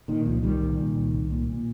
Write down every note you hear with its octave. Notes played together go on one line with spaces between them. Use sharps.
A#2 D#3
C2 F3
C2 D#3 G3
A#2
A#2
C2
C2
A#2
A#2